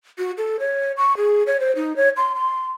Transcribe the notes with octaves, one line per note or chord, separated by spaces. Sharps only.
F#4
A4
C#5
C#6
G#4
C#5
C5
D#4
C#5
C6
C6